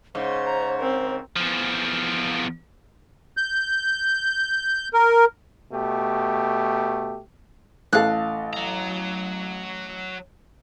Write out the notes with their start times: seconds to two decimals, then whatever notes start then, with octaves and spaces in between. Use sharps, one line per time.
0.15 G#2 C#3 C5
0.46 A#5
0.79 C4 A#4
1.36 E2 F3
3.37 G6
4.94 A#4
5.71 B2 A3 G4
7.93 A1 A4 F5 F#6
8.53 F#3 A#5